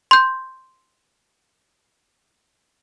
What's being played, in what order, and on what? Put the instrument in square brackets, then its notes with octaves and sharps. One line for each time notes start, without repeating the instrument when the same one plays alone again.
[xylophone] C6 G6